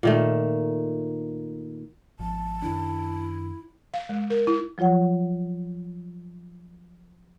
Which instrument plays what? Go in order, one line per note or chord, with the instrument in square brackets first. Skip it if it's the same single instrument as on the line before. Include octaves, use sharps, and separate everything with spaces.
[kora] A#2 D#3 A3
[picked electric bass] G#1 F3 [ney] A5
[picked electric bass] F#2 D#3 D4 [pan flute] E4
[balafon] F5
G#3
A#4
E4
[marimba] F3 F#3 F4 C#5 F#5